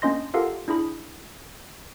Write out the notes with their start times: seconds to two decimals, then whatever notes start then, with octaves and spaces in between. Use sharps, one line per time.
0.02 A#3 C#4 D4 D#5 C6 A#6
0.34 F4 G4 A4 A#4 F5 F#5
0.68 D4 E4 G#4 B5